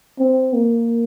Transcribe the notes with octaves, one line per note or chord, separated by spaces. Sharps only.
C4
A#3